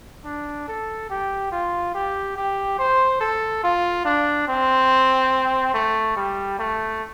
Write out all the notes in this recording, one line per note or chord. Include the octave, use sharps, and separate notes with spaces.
D4
A4
G4
F4
G4
G4
C5
A4
F4
D4
C4
A3
G3
A3